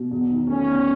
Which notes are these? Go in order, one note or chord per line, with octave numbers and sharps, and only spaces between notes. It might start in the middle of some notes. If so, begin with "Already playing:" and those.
Already playing: B2
E2
D#3
A3 C#4
E2